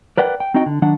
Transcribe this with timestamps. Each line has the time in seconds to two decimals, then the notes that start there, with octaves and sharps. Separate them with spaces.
0.17 A#4 B4 D5 F#5 G5
0.40 G5
0.54 C4 D#4 F#4 D#5 G5
0.66 D3
0.82 D#3 F#3 D4 F#5